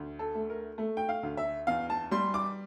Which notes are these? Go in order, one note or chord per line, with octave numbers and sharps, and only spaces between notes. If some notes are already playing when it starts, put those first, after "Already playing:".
Already playing: D2
A4
A3
A#4
A3
G5
F5
D2
E5
E2 F5
A5
G3 C6
D6